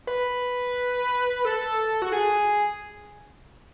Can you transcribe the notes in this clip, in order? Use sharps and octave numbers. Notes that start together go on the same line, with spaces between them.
B4
A4
F#4
G#4